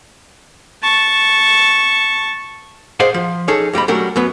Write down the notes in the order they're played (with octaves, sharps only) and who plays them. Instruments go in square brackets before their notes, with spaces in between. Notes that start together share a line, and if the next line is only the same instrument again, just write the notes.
[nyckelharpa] A5 C#6
[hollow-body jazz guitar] G#4 C5 D5 D#5 F5 F#5
F3
C#4 D#4 G#4 A4 C#5
F2 G3 D#5 B5
F#3 G3 A3 C#4 G4 A#4
F#2 F#3 B3 B4